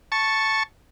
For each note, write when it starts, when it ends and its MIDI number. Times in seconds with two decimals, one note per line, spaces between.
0.12 0.63 81
0.12 0.63 85